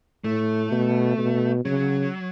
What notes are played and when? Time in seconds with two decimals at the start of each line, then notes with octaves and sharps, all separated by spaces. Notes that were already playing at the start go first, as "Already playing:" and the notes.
0.24 A2 A3
0.72 B2
1.18 B2
1.65 C#3 F#3